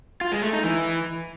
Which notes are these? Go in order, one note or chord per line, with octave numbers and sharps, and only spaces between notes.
F4
G#3
A3
D#4
E3